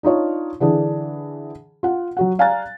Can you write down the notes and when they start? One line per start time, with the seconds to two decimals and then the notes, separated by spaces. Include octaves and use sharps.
0.03 D4 D#4 F4 C#5
0.60 D3 E3 D4 G#4
1.83 F4 F#5
2.17 F#3 F#4 F#5
2.39 D5 F5 G#5 A#5 F#6 A6